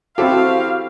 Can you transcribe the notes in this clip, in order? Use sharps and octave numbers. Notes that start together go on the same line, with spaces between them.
C4 E4 F#4 G4 A4 C5 F5